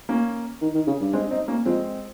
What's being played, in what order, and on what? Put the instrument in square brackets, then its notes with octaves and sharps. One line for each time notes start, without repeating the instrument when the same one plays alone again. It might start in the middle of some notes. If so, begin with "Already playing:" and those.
[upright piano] A#3 C#4
[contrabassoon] D#3
D#3
C#3
G2
[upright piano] G#3 C4
C4 D#4
A#3 C#4
[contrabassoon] F2 [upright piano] G#3 C4